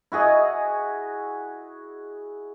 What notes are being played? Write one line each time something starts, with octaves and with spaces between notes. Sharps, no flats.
E4 F#4 G#4 D#5